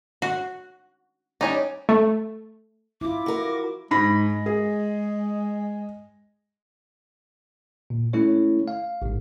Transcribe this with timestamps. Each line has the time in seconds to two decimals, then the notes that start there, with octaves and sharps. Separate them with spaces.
0.22 F#4
1.41 G3 C#4 D#4 D5
1.89 A3
3.01 E4 F4 D6
3.26 F#4 A#4
3.91 G#2 G#3 B5 A#6
4.46 G#4
7.90 A#2
8.13 A3 C#4 E4 C#5
8.68 F5
9.02 A1 G#2